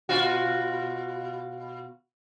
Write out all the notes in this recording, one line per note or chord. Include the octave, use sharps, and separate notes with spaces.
B2 F4 F#4